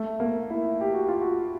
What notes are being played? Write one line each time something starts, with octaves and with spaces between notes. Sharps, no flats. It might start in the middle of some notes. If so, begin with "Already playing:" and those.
Already playing: A3
A#3
E4
G4
F#4
F4
F#4